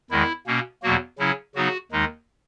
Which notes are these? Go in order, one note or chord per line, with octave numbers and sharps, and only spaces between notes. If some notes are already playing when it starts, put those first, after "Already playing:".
E2 D#3 G#3 E4
B2 A#3 C#4
E2 B2 F#3 A#3 F#4
C#3 F#3 C#4 E4
C#3 F#3 B3 D#4 F#4
D#2 D#3 G#3 D#4